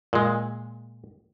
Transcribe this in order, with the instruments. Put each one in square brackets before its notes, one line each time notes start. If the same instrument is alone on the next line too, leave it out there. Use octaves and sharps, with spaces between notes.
[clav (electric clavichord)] A#2 G#3